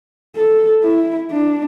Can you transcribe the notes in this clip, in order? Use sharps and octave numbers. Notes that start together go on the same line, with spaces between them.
A4
E4
D4